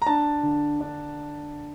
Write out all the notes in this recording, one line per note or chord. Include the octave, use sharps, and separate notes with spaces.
A#5
D4 A5
D3
D4